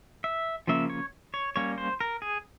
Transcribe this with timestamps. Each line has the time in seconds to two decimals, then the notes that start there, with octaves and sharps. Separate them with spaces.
0.24 E5
0.67 C#3 F3 A#3 C#4 E5
0.90 C#5
1.34 C#5
1.56 G3 A#3 C#4 C#5
1.78 C5
2.01 A#4
2.22 G#4